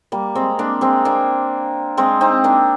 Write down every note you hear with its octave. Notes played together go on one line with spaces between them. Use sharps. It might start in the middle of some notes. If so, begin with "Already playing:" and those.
G3 A#3
G#3 C4
A#3 D4
G#3 C4
A#3 D4
G#3 C4
C4 D#4
A#3 D4